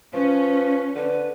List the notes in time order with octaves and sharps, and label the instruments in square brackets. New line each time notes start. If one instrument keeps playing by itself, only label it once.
[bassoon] F3 [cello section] C#4 [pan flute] B4
[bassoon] D3 [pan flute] B4